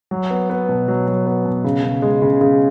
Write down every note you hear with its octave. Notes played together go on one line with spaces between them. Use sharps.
F#3
B3
B3
B2
F#3
F#3
B3
B2
C#3
C#3
G#3
C#3
C#3